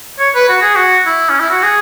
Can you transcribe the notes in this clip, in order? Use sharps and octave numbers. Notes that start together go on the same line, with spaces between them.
C#5
B4
F#4
G#4
F#4
E4
C#4
E4
F#4
G#4